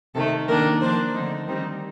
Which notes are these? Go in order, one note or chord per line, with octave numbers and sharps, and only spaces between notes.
C3 D#3 A3 A4
D#3 A#3 D4 A#4
F3 A#3 D4 C5
D3 A3 C4 D#4
D#3 G3 C4 D#4